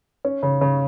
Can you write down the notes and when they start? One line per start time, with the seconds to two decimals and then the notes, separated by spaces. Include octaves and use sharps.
0.25 C#4
0.43 C#3
0.61 C#3